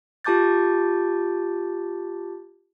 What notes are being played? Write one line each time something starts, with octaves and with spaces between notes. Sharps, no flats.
F4 G4 A5 D6 G6 A6